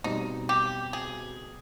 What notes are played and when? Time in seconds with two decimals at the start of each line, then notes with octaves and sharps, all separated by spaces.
0.04 B2 G3 C4 D#4
0.49 G4
0.93 G#4